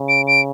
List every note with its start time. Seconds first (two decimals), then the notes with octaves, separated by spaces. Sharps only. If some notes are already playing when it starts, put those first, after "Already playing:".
Already playing: C#3
0.09 D7
0.28 D7